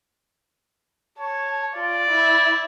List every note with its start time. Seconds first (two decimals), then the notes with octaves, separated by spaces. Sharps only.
1.19 C#5 A5
1.73 F4 D5
2.10 E4